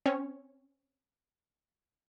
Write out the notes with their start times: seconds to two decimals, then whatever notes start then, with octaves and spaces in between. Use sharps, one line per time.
0.06 C4 C#4 C#5